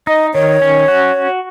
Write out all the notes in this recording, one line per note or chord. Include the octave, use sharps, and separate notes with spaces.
D#4 D#5
D#3 C#5
C#4
F#4